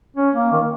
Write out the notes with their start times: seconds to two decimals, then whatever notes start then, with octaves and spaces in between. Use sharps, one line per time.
0.17 C#4
0.35 A#3
0.52 D#3